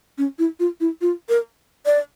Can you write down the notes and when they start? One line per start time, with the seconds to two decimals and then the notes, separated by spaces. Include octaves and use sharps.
0.18 C#4
0.39 E4
0.60 F4
0.80 E4
1.01 F4
1.29 A#4
1.86 D5